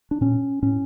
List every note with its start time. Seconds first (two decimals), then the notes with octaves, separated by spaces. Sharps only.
0.11 D4
0.21 A#2 C#4
0.62 A2 C#4